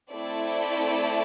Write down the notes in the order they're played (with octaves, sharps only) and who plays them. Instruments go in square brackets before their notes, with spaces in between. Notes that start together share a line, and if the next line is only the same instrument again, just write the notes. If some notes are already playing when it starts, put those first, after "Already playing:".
[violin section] A3 C4 E4 A4 D5